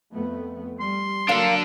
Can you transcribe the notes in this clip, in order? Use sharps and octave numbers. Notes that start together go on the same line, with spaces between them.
F2 A3 B3
G3 C6
F#3 A#3 D4 A4 A#4 F5